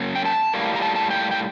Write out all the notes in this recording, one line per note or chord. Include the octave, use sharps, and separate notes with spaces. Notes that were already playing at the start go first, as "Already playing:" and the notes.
Already playing: F#2 F#3 A#3
G5
A5
A2 G3 A#3
A#5
A5
A5
G5
G5